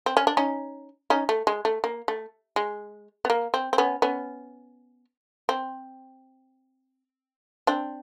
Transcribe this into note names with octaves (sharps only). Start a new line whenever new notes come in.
C4
C#4
D4
C#4 D#4
C#4 D#4
A3
G#3
A3
A#3
A3
G#3
B3
A#3
C4
C4
B3 C#4
B3 C#4
C4
C4 D4